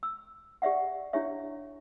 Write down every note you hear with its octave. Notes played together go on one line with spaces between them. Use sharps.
E6
G4 D5 E5 F#5
D4 E4 G4 C#5 E5